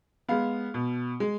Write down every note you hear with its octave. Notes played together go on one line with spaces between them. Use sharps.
G#3 B3 F5
B2
G#3